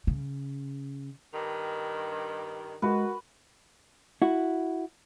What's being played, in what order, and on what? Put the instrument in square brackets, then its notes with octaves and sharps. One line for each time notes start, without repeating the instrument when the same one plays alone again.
[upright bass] C#3
[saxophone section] G2 D#3
[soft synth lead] G#3 [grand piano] F#4 A#4 [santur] B4
[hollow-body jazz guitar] E4 F#4